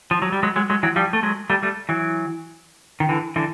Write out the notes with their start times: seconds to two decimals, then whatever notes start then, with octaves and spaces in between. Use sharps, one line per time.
0.11 F3
0.22 F#3
0.32 G3
0.43 F#3 G#3
0.56 F#3 G#3
0.70 F#3 G#3
0.83 E3 F#3
0.96 F3 G3
1.13 A3
1.23 F#3 G#3
1.50 G3 A3
1.63 G3 A3
1.89 E3 F#3
3.00 D#3
3.09 D3 E3
3.36 D3 E3